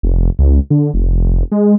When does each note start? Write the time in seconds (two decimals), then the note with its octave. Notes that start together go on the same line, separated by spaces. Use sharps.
0.03 F1
0.39 C#2
0.70 D3
0.94 F1
1.52 G#3